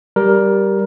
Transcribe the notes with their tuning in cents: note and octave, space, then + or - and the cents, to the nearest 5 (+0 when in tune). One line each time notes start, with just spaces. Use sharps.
G3 -5 A#4 +15